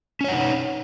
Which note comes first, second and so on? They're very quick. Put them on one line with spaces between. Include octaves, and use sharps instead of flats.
C#4 C#5 F#5 D#4